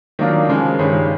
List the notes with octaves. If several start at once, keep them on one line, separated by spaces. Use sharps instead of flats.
D#3 F#3 A#3 D4 F4
C#3 F3 G#3
G2 D#3 G#3 C#4